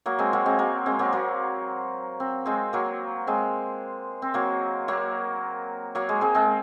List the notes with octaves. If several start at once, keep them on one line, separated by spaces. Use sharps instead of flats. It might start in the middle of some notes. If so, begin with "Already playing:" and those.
F#3 A#3
G#3 C4
F#3 A#3
G#3 C4
F#3 A#3
G#3 C4
F#3 A#3
F#3 A#3
C4
G#3 C4
F#3 A#3
G#3 C4
C4
F#3 A#3
F#3 A#3
F#3 A#3
G#3
G#3 C4
G#3 C4